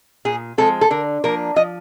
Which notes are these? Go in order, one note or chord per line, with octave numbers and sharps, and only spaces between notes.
A#2 G#4
F3 G#3 C4 A4
A4
D3 A#4
F3 A#3 D4 A#4
F3 D#5